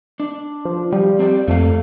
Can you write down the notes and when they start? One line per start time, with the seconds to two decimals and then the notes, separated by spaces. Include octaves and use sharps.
0.20 D4
0.65 F3
0.92 F3 G3
1.19 C4 G4 D5
1.48 F2 A3 A#3 F5